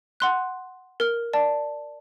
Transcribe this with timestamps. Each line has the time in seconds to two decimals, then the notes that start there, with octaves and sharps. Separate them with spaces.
0.20 F#5 C6 F#6
1.00 A#4 F6
1.33 D5 A5